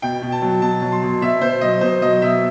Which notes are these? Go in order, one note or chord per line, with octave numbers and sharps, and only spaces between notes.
B2 G5
B2
A5
F#3
B2 A5
F#3
C6
B2
B2 E5
B2 C5
F#3 D#5
B2 C5
F#3 D#5
B2 E5